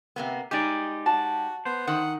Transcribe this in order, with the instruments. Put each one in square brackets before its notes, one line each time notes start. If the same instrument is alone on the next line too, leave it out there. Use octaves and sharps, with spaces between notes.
[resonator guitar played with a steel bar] C3 A#3 B3
[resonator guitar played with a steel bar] G#3 D#4 [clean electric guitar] G4 D5
[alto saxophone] F#4 [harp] A5
[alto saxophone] B3 [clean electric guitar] C5
[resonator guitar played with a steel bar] D#3 [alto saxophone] F#5